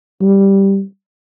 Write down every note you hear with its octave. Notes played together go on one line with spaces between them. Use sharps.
G3